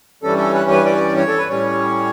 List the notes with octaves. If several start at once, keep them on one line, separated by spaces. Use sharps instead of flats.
G2 E3 G3 C#4 A4
A4
B4
B4
D5
C#5
A4
B4
A2 G3 C#4 C#5